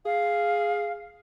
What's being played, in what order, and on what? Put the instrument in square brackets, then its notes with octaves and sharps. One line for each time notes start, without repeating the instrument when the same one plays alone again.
[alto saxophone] G#4 [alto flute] F5